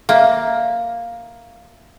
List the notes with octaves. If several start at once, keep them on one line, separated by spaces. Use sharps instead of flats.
A#3 E5 F5